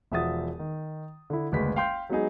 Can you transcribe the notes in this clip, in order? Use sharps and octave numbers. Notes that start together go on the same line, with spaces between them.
E1 F3 E5 F#5 D#6 A6
D#3
D3 E4
F#1 D2 G#3 B4 B6
F5 G5 C6 G6
F#3 G#3 B3 D#4 G#4